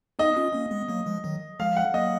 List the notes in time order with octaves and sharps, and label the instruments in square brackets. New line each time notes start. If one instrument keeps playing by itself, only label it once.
[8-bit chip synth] B3 D#4 [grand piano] D#5
[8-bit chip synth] C#4 F4
A#3 C#4
G#3 B3
F#3 A#3
F3 G#3
D#3 F#3
[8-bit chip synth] F3 G#3 [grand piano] F5
[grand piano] F#5
[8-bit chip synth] F#3 A#3 [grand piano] D#5